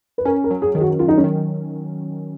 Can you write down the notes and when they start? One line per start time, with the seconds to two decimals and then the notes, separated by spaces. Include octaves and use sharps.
0.18 B4
0.25 C#4 A#4
0.44 A#4
0.51 F#3
0.62 G#4
0.75 D#3 G#4
0.81 F#4
0.99 D#3 F4
1.08 D#4
1.18 C#4
1.24 D#3